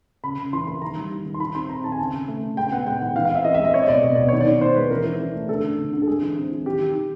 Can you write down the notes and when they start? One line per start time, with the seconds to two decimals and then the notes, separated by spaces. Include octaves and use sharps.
0.24 C#3 B5
0.38 C#3
0.53 E3 C6
0.67 A#3 B5
0.82 D#3 A#5
0.97 G3
1.11 D#3
1.26 D#3
1.34 C6
1.40 D#3 B5
1.55 C4 C6
1.69 C4 A#5
1.84 D#3 A5
1.92 G#5
1.99 C#3 A5
2.13 C#3
2.28 A3
2.43 C#3
2.56 G#3 G5
2.67 G5
2.72 B3 F#5
2.86 G#3 G5
3.01 D#3 F#5
3.15 E3 F5
3.25 F5
3.30 C4
3.35 E5
3.44 E3 D#5
3.54 E5
3.59 G#3
3.65 D#5
3.74 C4 C#5
3.83 D#5
3.88 B2 D5
4.03 B2 D#5
4.15 B2 D5
4.28 D#3 C#5
4.41 D5
4.47 D#3
4.61 D#3 C5
4.76 G#3 B4
4.90 E3 A#4
5.05 E3
5.20 E3
5.35 A3
5.49 D3 A4
5.64 D3
5.78 D3
5.93 D3
6.02 A4
6.07 G#3 G#4
6.22 E3
6.37 C4
6.52 E3
6.66 D#3 G4
6.81 D#3
6.95 D#3